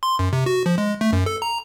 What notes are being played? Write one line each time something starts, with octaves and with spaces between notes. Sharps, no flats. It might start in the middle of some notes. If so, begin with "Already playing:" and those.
C6
F#2
C3
F#4
F3
G#3
A3
F#2
A4
A#5